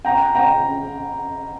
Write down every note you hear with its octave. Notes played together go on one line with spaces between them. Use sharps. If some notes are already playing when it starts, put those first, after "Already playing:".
G5 A#5
G5 A#5